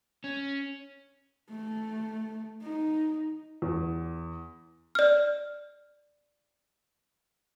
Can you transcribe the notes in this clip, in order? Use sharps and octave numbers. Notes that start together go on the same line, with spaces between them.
C#4
A3
D#4
E2
D5 F6